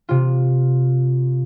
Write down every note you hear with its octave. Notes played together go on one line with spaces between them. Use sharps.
C3 F4